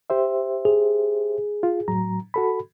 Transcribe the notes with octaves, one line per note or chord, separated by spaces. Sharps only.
G4 C5 E5
G#4
F4
A2 F#3 A#5
F#4 A4 B5